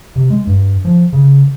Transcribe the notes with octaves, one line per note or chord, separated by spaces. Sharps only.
C3
G#3
G2
F3
C#3